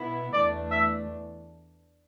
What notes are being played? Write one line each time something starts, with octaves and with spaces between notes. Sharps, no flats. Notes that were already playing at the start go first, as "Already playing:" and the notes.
Already playing: B2 B3 E4
E2 E3 A3 D4 D5
E5